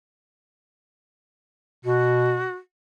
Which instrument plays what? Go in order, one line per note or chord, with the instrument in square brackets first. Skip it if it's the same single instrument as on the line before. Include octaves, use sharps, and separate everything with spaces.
[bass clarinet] B2 [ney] F#4